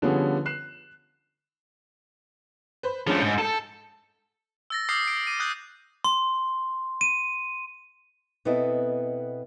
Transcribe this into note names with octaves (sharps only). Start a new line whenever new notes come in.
D3 F3 G3 B3 C#4 G#4
F#6 C7 E7
B4 C5
F3 G#3 A3 C#4 D4
G#2 G6
A4
E6 A6 A#6
D6 D#6 F6 G6 C7
D7
D6 D#7
D#6 F#6 G6 A#6 D#7
C6
D#7
B2 B3 C4 E4 A4 D#5